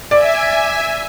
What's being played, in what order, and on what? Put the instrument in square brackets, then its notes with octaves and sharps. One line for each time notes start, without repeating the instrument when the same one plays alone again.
[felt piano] D5 [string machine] E5 G#5